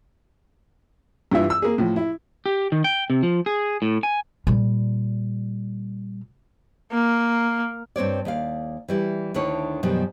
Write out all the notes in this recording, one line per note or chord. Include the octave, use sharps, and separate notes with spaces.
G2 E3 F4 E5
E6
A#3 G#4
A2 F3
E4
G4
D#3
G5
C3
F3
G#4
A2
G#5
A#2 G3
A#3
G2 C4 C#5 D5
D#2 D5 F5
E3 G3 E4
D2 D3 D#3 E4 C#5
F#2 B2 D#3 F3 G3